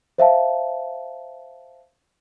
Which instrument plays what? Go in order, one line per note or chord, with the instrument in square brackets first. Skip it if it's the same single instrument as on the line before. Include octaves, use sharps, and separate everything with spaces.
[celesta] C5 E5 F5 A5